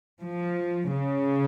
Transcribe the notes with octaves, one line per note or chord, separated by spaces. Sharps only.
F3
C#3